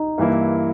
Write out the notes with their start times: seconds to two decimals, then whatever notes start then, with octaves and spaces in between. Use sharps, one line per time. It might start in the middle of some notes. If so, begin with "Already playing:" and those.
Already playing: D#4
0.18 G2 E3 A#3 E4